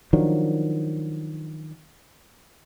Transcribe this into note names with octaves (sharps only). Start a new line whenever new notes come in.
D#3 F3 F#3 D4